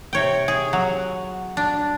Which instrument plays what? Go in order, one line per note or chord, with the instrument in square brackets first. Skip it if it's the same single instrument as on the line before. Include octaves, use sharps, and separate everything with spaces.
[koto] C3 C#5 G5
G#4
F#3
D4